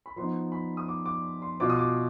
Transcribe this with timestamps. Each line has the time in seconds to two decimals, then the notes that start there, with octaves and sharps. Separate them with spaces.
0.06 B5
0.16 F3 B3 D#4 C6
0.52 B5
0.77 D#6
0.88 D6
1.06 D6
1.42 C6
1.60 B2 B3 F4 D6
1.70 D#6
1.79 D6